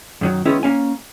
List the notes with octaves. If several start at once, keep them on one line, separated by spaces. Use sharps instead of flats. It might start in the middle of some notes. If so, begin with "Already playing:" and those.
F#2 D#3 F#3
D#3 G#3 B3 C#4 E4
A#3 C#4 G#5